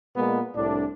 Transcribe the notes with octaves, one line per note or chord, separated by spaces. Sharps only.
A#2 G#3 A#3 B3
C2 A2 D4